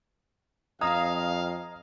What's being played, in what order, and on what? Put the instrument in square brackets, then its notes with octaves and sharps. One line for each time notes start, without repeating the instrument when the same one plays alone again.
[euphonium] F2 [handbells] D#5 A#5 G#6 [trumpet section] F5 [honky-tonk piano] D#6